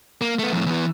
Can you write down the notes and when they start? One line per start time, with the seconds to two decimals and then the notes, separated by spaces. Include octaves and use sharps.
0.21 A#3
0.39 A3 B3
0.53 F2 A2
0.66 E2 E3